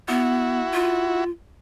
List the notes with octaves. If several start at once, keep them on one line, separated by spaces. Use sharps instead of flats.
B3 E4 F#4
F4